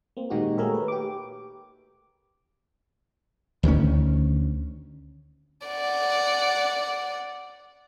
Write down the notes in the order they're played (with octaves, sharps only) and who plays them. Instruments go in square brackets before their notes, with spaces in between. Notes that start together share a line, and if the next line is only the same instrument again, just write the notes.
[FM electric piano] A#3 C4
A#2 D#3 G#3 D#4 F#4 G4
A3 A#3 G#4 A#4 C#5 E5
B4
G4 D6
[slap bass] D2 D#3 F3 C#4
[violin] D5 F#5